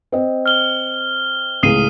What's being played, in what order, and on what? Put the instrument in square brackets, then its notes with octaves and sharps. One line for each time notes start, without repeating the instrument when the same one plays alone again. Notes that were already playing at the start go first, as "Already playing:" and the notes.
[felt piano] C4 D#5
[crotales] F6 G7
[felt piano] C#2 A2 G#4 [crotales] D#6 C7 D#7